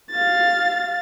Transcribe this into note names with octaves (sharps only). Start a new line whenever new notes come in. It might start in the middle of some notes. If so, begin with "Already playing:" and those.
F5 A6